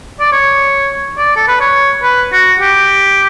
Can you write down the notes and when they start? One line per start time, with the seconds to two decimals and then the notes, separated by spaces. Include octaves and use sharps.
0.20 D5
0.32 C#5
1.18 D5
1.36 A4
1.48 B4
1.61 C#5
2.03 B4
2.32 F#4
2.60 G4